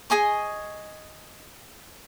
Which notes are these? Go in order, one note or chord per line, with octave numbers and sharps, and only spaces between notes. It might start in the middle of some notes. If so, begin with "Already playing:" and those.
G#4 D#5 G#5 C#6